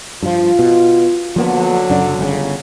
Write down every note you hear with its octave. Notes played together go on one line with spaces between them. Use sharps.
G2 F3 F4
B2
D3 F3 F#3 A#3 B3
F#2 C#3 D4
G1 C#3